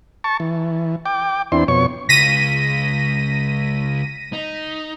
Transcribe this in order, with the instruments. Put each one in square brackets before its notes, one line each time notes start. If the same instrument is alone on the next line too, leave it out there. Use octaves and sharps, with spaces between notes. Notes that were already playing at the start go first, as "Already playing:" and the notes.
[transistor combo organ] A5 C#6
E3
G5 D6
E2 C4 D4 E4 C6
F2 B2 C#5 C#6
[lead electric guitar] C#2 [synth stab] A#6 B6 D#7
[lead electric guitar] D#4